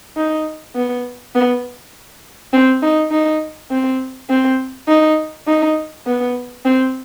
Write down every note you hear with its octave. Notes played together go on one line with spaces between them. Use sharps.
D#4
B3
B3
C4
D#4
D#4
C4
C4
D#4
D#4
B3
C4